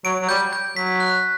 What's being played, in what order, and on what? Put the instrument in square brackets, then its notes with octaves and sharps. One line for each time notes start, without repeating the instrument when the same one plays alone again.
[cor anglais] F#3 [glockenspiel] D7
[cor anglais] F#3
[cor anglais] G3 [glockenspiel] G6
[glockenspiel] G6
[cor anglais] F#3 [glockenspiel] B6
[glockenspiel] F#6